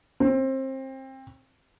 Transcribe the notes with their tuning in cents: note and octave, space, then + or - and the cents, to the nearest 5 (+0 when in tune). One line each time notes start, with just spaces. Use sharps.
C4 +25